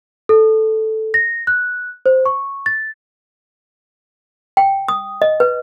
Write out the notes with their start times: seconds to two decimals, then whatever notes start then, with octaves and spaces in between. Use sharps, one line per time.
0.29 A4
1.14 A#6
1.47 F#6
2.06 C5
2.26 C#6
2.66 A6
4.57 G5
4.88 D#6
5.22 D#5
5.40 B4